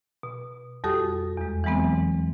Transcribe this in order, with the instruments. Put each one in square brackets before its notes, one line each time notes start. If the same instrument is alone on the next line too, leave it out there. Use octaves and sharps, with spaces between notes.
[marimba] B2
F2 G3 F#4 G4 A4 D#6
E2 G#3
E3 F#3 G#3 B3 C4